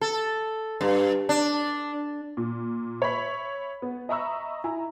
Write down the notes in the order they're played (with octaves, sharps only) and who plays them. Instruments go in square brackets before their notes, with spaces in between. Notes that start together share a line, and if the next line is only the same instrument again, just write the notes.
[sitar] A4
G2
D4
[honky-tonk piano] A#2
C#5 E5 B5 B6
B3
D#5 E5 A#5 B5 C#6 E6
E4 G#5 A#5